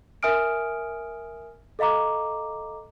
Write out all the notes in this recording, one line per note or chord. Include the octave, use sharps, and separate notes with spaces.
A#4 E5 G#5 D#6 F6 D7
A4 D#5 F5 A#5 D6